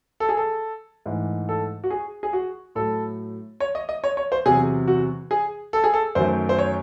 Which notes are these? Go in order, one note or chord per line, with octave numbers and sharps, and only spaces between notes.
A4
G#4
A4
G#2 E3 A3
A4
F#4
G#4
G#4
F#4
A2 F#3 A3 A4
C#5
D#5
D#5
C#5
C#5
C5
E2 C3 F#3 G#4
F#4
G#4
A4
G#4
A4
F#2 D#3 F#3 A3 C5
C5
C#5